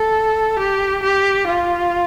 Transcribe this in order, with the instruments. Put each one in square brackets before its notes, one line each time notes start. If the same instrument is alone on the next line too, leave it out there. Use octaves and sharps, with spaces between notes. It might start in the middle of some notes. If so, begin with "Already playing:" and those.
Already playing: [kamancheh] A4
G4
G4
F4